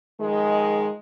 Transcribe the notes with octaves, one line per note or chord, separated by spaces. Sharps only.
D#3 F3 G#3